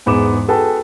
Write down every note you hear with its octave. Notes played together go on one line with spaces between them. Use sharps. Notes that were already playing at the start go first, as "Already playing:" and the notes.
E2 G#2 B3 D#4 D6 E7
F#4 G#4 A4 B4 G5 A5